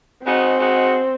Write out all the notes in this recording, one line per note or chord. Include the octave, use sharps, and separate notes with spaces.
C#3 G#3 C4 D#4 F#4
C#3 G#3 D#4 F#4